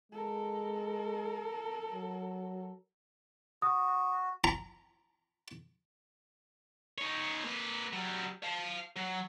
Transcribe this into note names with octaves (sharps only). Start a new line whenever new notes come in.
G#3 A4 A#4
F#3
F#4 D#6
A#5
D#4 C#5
A#3 B4
F#3 G3
F5 A5
F#3